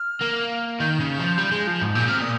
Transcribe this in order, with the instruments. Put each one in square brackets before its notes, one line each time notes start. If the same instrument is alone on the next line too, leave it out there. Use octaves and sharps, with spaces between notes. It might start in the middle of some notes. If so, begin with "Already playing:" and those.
Already playing: [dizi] F6
[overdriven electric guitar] A#3
[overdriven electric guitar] D#3 [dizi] G6
[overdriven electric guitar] C#3
F3
G3
G#3
F3
G#2
[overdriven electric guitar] A#2 [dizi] G6
[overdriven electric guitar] C3 [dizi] F6
[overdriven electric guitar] A#2 [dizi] D#6